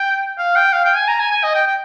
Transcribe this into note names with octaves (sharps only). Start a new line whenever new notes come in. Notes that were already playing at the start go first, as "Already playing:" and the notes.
Already playing: G5
F5
G5
F5
G5
G#5
A#5
G#5
G#5
D#5
G5
G5